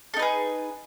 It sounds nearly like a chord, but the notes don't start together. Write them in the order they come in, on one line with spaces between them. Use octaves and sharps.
A4 D#4 B4 G#4